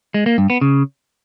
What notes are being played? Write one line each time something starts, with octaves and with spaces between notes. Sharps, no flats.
G#3
A#3
G2
B3
C#3